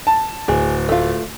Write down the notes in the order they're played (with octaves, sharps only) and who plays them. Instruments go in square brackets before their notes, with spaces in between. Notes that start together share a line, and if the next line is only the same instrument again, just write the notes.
[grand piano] A5
[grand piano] D1 [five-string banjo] G#4
[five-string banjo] A3 F4